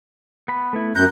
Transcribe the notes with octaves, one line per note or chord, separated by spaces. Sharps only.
B3 B5
A3 B3 E4
F#2 A#5 F#6 G6